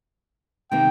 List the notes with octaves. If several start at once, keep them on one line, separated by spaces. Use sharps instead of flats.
C3 D#3 A#3 G5